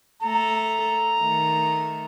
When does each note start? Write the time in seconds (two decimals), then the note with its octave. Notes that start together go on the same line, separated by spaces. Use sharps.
0.22 A3 A4 A#5
1.20 D#3 A3